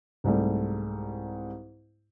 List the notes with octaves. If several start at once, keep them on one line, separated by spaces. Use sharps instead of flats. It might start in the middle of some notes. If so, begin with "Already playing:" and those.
C2 G#2 G3 A3